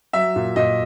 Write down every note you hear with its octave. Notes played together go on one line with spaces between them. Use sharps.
F#3 E5
A#2
A#2 D#5